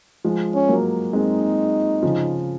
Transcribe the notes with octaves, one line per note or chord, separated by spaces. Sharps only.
F3 G#3
C#4
F#3 A#3
G#3 C4 D#4
C#3 F3